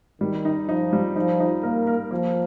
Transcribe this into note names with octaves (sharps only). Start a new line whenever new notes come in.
D#3 G3
D#4
F3 D#4
G3
F3 D#4
D#4
A#3 A#4
A#4
F3 A#3